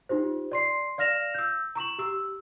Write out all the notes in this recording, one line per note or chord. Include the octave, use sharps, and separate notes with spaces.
D#4 F4 G4 C5
D5 C6 C7
D5 F5 F6 A#6 E7 F7
E6 G6
A#5 C#6 E7 F#7
G4 E6